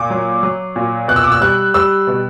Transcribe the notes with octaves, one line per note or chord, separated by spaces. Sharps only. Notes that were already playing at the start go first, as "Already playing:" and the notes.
Already playing: A#2 D6
F#3
F#3
A#2
B2 F#6
E6
D6
E6
G3 F#6
G3 E6
B2